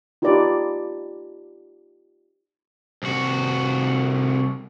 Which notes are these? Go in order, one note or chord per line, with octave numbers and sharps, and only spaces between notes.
D#4 F4 G4 B4 D5
C2 F#4